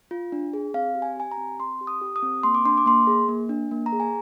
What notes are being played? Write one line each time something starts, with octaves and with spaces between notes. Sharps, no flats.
F4
D4
G#4
C4 F5
G4
G#5
G4 G#5
A#5
C4
C4 C6
G4
D#6
G4
D#6
C4
A#3 C6
D6
D4 C6
D6
A#3 C6
G#4
A#3
D4
A#3
A#5
G#4
G#5